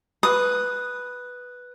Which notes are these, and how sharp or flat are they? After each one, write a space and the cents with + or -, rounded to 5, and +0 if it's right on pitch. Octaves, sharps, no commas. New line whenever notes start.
B4 +0 D#6 +0